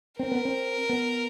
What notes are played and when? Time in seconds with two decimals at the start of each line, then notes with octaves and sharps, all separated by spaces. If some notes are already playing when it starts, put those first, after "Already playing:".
0.19 C4 A#4
0.32 B3
0.45 C4
0.89 B3